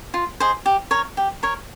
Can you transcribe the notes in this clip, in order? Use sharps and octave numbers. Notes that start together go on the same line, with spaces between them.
F4
G#4 C5 D#5
G4
A#4 C#5
G4
A#4 C#5